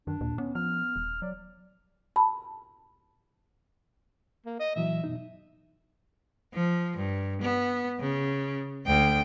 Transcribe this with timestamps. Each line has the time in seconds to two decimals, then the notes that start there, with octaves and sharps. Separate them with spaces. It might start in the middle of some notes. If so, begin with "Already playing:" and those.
0.07 F#2 D#3 D4
0.21 D#2 A#2
0.38 B3 C#4
0.55 F3 F6
0.96 D#1
1.22 F#3 D5
2.16 A5 B5
4.46 A#3
4.60 D#5
4.76 A#2 E3 F#3 E5
5.04 F#2 B2 D#4
6.54 F3
6.97 G2
7.41 B3
8.00 C#3
8.86 D2 G5